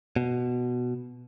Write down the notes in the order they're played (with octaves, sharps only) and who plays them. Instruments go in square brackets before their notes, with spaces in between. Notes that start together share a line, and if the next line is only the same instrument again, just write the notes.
[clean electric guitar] B2